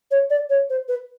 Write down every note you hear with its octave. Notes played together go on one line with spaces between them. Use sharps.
C#5
D5
C#5
C5
B4